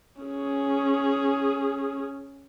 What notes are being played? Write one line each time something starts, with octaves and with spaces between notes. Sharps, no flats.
C#4 G#4